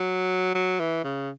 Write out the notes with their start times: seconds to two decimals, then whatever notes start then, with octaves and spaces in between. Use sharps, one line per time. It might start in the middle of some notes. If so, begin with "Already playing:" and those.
Already playing: F#3
0.55 F#3
0.79 E3
1.04 C#3